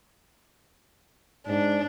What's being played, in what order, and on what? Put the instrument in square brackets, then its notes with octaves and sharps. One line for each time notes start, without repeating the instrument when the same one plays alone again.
[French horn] G#2 [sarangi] D4